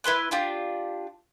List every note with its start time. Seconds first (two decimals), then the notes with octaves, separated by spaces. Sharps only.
0.04 E4 B4 C6 F#6
0.31 D4 F4 G4